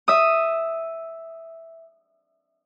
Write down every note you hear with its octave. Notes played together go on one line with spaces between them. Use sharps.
E5 D#6